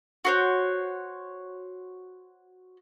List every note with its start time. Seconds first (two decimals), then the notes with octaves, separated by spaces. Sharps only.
0.25 F#4 C5 C#5